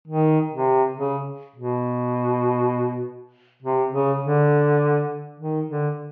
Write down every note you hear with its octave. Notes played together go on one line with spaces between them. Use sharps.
D#3
C3
C#3
B2
C3
C#3
D3
D#3
D3